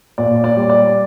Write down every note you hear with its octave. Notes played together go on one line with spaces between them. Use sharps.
A#2 D5
D5
G3
D5